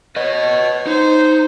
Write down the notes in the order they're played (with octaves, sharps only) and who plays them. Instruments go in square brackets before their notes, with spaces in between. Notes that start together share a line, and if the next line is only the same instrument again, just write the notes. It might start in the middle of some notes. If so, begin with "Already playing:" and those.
[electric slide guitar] B4 D#5 [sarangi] C#5
[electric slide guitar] D#4 [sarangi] C5